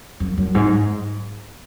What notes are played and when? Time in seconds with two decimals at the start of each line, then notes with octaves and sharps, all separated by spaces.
0.20 F#2
0.38 F#2
0.55 G#2